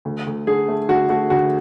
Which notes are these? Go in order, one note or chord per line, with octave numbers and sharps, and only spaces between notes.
D2
D2
D3 G#4
A3
D3 F#4
A3 F#4
D2 F#4